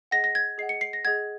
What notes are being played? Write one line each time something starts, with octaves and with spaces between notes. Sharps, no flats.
G#4 D#5 F#5 A#6
A#6
G#6
G#4 D#5 F#5 C7
C#7
C7
A#6
G#4 D#5 F#5 G#6